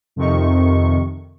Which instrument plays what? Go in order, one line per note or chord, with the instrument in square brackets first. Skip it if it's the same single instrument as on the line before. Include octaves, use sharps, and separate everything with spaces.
[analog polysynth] F2 C3 D#3 C#6